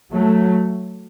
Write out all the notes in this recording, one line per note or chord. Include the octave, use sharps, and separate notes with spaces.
F#3 A3